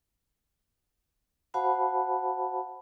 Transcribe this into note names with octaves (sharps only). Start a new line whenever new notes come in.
F#4 C5 F5 F#5 A5 B5